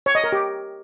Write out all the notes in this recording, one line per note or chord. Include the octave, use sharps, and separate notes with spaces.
C#5
D#5
A#4
G4